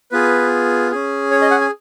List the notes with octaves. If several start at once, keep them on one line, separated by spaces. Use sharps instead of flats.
B3 F4 G#4 B4
C#4 G#4
C#5
D#5
F#5
G#5